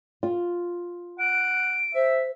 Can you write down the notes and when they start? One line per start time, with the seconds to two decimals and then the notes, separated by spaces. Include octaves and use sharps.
0.23 F4
1.19 F#5 D7
1.95 C5 E5